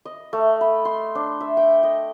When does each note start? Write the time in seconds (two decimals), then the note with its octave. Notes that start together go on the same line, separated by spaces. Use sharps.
0.05 D#5
0.33 A3
0.61 B5
0.85 C6
1.15 D4
1.41 E5
1.57 G5
1.83 D#5